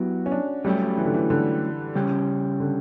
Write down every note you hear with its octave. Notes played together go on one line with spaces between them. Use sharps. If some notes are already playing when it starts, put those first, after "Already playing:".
Already playing: F#3 B3 E4 F#4 G4
C#4
D4
F#3 G3 A3 C#4 G4
E3
D3
E3
D3
C#3 G3 C#4 G4
D3